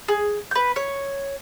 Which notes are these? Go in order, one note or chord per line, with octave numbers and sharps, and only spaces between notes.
G#4
B4 G6
C#5